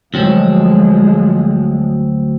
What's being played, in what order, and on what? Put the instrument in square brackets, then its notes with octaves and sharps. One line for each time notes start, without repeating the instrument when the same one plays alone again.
[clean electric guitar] D2 F#3 C4 [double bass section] F3 G#3